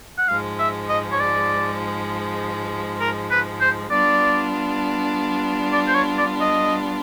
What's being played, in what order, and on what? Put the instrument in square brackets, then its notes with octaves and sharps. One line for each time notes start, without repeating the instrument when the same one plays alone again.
[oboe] F#5
[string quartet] G#2 F3 G#3 [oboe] F5
[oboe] E5
D#5
C#5
D5
A#4
B4
C5
[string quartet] G3 B3 D4 F4 [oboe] D5
[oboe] D5
C5
C#5
D5
D#5